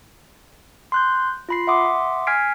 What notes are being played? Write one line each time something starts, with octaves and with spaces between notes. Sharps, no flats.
C6 F#6 G6
F4 B5 C7
E5 F#5 C6 D6 D#6
G#5 F6 G#6 B6 C7 D7